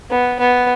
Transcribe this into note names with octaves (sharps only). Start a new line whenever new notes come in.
B3
B3